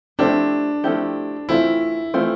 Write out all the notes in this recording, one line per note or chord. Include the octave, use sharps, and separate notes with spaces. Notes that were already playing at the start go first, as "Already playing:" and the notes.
F3 A3 C4 D4 E4 G4
F3 A3 C4 E4 G4
E3 A3 C4 E4 F4
E3 A3 C4 F4